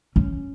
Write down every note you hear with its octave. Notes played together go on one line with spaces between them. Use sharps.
C#4